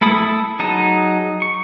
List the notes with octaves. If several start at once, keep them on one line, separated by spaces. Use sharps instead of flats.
A3 E4 A4 B5 D#6
F#3 D#4 G#4 A5 D#6
C#6